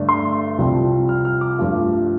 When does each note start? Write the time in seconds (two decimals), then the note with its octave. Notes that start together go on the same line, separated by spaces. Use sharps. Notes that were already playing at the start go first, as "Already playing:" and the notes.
Already playing: G2 D3 A3 D4
0.09 C6
0.58 C2 C3 F3 C4 F4
1.09 F6
1.25 F6
1.41 D6
1.58 G2 F3 A3 F4